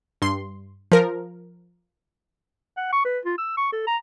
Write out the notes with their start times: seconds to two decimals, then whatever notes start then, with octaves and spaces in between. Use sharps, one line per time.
0.22 G2 C6
0.92 F3 A#4
2.77 F#5
2.93 C#6
3.05 B4
3.25 F4
3.38 E6
3.57 C#6
3.72 A4
3.87 A#5